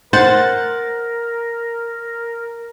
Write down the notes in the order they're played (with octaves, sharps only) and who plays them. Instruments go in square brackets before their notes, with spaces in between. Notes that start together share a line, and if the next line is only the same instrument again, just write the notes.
[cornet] A#4 [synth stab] C5 A6 [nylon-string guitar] F#5